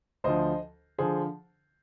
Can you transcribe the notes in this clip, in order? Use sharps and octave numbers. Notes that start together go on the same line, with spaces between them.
D2 D3 F3 C5 D#5
D3 F3 G#4 C5